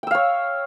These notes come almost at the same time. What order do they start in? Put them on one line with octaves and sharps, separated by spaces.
G5 E6 F5 C#5